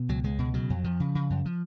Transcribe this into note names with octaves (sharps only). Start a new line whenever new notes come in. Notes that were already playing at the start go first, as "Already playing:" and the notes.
Already playing: B2
C#2 F#3
C#2 G#3
B2
C#3 F#3
F2
F2 F3
C#3
C#3
F#2
F3